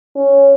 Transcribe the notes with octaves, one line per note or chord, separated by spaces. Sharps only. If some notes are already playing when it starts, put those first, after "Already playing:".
C#4